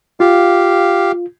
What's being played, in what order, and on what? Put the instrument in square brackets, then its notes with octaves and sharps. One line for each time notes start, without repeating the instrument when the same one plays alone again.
[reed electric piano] F4 [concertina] G4 F5